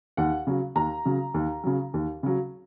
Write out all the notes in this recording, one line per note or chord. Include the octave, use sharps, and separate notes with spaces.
D#2 F#5
C#3 F#3
D#2 A#5
C#3 F#3
D#2
C#3 F#3
D#2
C#3 F#3